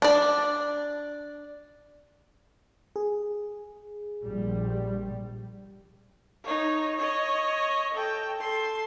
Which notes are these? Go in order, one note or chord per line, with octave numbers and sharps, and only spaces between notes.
D4 D5
G#4
A#1 G3
D#4 C#5
C#5 D#5
A4 G5
A4 C6